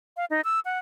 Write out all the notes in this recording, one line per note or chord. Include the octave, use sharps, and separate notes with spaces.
F5
D#4
E6
F#5